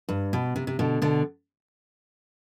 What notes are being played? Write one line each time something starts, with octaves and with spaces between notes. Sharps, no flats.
G2
B2
C3
C3
B2 D3
B2 D3